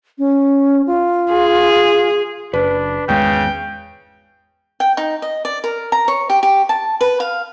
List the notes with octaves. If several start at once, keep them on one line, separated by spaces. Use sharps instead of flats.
C#4
F4
G#4
F#1 D4 B4
G#1 E2 C#3 G#3 G5
G5
D#4
D#5
D5
A#4
A#5
C#5
G4
G4
A5
B4
F5